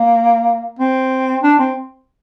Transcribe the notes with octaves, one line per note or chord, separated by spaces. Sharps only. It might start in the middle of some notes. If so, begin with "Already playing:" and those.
Already playing: A#3
C4
D4
C4